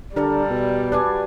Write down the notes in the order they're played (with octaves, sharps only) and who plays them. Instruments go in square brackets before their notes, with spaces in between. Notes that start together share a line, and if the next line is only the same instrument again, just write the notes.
[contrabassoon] D3 [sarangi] G3 [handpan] G4 D5 [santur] A4 A#4
[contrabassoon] B2
[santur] D4 G#5 [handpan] F#4 B4 D5